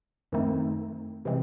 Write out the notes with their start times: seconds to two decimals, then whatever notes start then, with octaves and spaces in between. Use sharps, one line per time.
0.32 F#2 D#3 A3 C4 D#4
1.25 C3 E3 G#3 C4